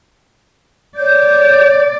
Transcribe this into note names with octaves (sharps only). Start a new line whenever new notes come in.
C#5 D5 G6